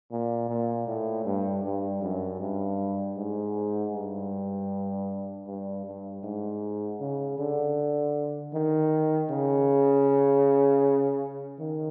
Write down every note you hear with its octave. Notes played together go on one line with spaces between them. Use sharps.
A#2
A#2
A2
G2
G2
F#2
G2
G#2
G2
G2
G2
G#2
C#3
D3
D#3
C#3
D#3